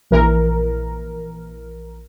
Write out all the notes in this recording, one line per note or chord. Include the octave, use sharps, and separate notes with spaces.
A#1 E3 A#4